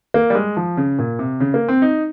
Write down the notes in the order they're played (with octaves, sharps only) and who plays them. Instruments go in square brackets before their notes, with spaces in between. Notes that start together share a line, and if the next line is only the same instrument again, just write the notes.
[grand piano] A#3
G3
G#3
F3
C#3
A#2
C3
C#3
A#3
C4
D#4